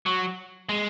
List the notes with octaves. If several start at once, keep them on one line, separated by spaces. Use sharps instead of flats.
F#3
G#3